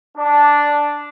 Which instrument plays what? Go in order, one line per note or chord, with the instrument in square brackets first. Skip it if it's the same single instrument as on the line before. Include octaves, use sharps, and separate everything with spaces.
[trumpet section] D4